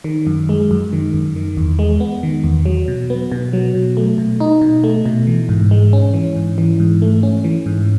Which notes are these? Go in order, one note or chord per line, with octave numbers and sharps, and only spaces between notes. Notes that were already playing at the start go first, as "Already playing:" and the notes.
D#3
F#2
G#3
F#2
D#3
F#2
D#3
E2
G#3
B3
D#3
E2
F#3
B2
B3
B2
F#3
B2
A3
B2
D#4
B2
A3
B2
E3
G#2
G#3
C#4
E3
G#2
E3
G#2
A3
C#4
E3
G#2